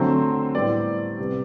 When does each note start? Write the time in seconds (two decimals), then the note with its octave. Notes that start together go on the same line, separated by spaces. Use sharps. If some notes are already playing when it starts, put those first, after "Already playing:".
Already playing: D3 F#3 A3 C4 C5
0.54 A2 G3 B3 D5
1.18 C3 G3 B3